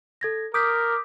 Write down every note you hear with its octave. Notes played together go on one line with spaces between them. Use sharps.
A4 G#6 A#6
A#4 D6 D#6 G6 B6